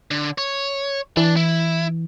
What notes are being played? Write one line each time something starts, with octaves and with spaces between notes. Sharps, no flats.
D3
C#5
E3 D4
E4